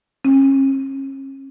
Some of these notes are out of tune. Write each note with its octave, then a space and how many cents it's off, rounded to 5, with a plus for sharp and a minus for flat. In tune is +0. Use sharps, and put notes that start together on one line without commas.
C#4 -40